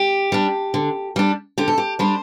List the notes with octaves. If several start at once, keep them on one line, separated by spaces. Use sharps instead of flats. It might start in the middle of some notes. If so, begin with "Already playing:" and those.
Already playing: G4
G3 D4
D3
G3 D4
D3 G4
A4
G4
G3 D4 C5